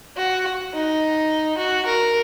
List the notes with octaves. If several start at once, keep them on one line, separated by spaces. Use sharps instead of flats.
F#4
D#4
F#4
A#4